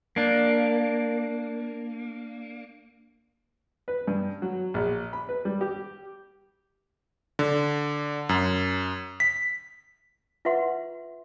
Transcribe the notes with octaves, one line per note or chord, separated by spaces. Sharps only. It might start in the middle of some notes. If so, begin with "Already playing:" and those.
A#3 D4
B4
G2
F#3
A#1
B5
B4
G3
G4
D3
F#2
B6
F4 B4 E5 F#5 C6